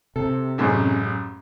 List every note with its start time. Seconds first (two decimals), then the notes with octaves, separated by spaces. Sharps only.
0.16 C3 A4
0.58 A1 F#2 G#3